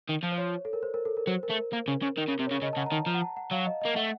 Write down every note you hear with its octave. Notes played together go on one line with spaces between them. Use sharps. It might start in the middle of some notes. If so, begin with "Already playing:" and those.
D#3
F3
C5
C#5
A4
A#4
C5
A#4
A4
A#4
F#3 C5
A#4
A3
A#4
A#3
C#3
C#3
D#3 A#4
C#3
C3
C#5
C#3
C#3 D#5
A5
C#3 F#5
A#5
D#3 A5
F3 A#5
F#5
A5
F#5
F#3 F5
D#5
D#5
A#3
A3 F#5